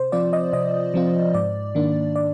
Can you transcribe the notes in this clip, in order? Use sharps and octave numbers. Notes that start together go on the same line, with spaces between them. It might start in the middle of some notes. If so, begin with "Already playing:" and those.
Already playing: C3 C5
F3 C4 F4 D5
D#5
C3 D#5
F3 C4 F4
G#2 D5
D#3 A#3 D4
D5